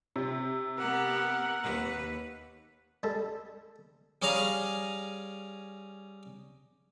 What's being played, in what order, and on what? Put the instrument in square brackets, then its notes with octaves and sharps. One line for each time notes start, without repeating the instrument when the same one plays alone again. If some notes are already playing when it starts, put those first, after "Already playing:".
[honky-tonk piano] C3
[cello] B3 G4 [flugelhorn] A#4 [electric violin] F#5
[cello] D#2 B4
[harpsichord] G3 G#3 A4
G3 C#4 G#4 F5 A#5